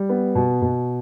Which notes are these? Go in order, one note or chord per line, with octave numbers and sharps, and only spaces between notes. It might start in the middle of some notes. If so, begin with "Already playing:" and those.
Already playing: G3
B3
B2
B2